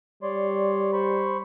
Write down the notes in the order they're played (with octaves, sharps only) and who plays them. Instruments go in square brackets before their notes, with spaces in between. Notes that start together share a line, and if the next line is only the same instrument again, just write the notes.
[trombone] G3 [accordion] C#5 D5 C6
[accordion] C5 B5 C#6